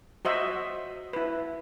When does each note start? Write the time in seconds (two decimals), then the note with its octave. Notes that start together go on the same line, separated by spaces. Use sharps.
0.25 F#4 C5 D#5 E5
1.13 E4 B4